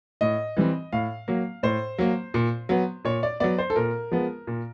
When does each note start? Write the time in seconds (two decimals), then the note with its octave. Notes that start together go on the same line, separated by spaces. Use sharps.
0.21 A2 D#5
0.57 E3 G3 C4
0.93 A2 F5
1.28 F#3 A#3
1.63 A2 C5
1.98 F#3 A#3
2.34 A#2
2.69 F#3 B3
3.05 A#2 C#5
3.23 D5
3.40 F#3 B3 D5
3.58 C5
3.70 A4
3.76 A#2 A#4
4.12 F3 G#3 B3
4.47 A#2